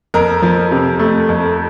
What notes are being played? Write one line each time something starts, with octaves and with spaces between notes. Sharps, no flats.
F2 A#4
F3
C3
A3
F2